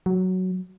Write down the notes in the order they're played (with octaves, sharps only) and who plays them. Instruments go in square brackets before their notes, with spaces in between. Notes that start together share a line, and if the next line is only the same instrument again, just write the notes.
[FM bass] F#3